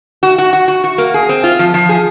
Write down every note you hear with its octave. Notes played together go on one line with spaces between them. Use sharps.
F#4
F#4
F#4
F#4
F#4
A#3
G#4
C4
F4
F3
F3
G#4